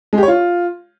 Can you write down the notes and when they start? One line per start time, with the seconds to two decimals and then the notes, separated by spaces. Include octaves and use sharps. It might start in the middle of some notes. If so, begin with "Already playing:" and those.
0.13 G#3
0.18 G4
0.23 C#5
0.28 F4